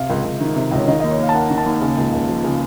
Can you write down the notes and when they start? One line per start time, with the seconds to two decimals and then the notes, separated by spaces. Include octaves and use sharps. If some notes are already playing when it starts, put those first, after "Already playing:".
Already playing: C3 F5
0.10 C#2
0.25 C#2
0.40 D#3
0.56 C3
0.72 C#2
0.77 C#5
0.87 D#3 D#5
1.00 D#2 D#5
1.11 C#5
1.19 D#2 F5
1.29 A5
1.34 A#3 F#5
1.50 D#3
1.58 A5
1.66 D#2
1.81 C#3
1.97 C#2
2.13 C#2
2.28 F3
2.44 C#3